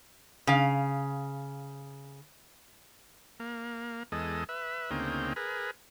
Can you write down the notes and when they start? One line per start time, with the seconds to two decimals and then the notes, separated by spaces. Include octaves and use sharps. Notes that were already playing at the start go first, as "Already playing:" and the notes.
0.47 C#3 F5
3.40 A#3
4.12 E2 G#3 A4 D#5
4.49 B4 E5
4.91 D2 C#3 A#3 C4 D#4 G5
5.36 G#4 A#4 B4